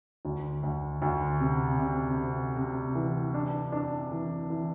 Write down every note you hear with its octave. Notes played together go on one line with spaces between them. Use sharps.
D2
D2
D2
C3
C3
C3
C3
E3
D4
D4
E3
E3